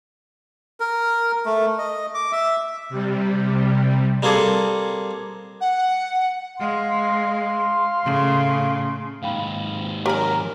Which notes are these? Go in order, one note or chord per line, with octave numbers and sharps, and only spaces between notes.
A#4
A3
D#5
D6
E5
C3 G3
G3 A#3 C4 G#4 A4
F#5
G#3 F5 C6
A2 C#3
D#2 G#2 F5 G5 B5
G4 A#4 C#5 G#5 A#5 B5